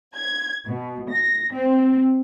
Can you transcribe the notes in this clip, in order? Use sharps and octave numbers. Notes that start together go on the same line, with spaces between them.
G#6
B2
A#6
C4